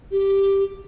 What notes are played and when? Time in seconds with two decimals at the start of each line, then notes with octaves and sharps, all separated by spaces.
0.12 G4